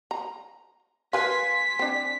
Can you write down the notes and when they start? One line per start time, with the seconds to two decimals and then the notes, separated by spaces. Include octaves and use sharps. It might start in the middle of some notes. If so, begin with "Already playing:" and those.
0.11 A#5
1.13 A#4 B4 F5 G#5 C6 B6
1.79 C4 D4